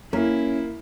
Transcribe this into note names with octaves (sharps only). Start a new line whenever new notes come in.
A#3 C#4 E4